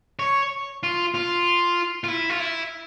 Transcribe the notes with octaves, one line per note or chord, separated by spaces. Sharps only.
C#5
F4
F4
F4
E4
F4
E4